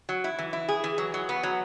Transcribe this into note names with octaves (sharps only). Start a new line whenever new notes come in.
F#3
E4
E3
E4
G#4
E3
F#3
F#3
B3
F#3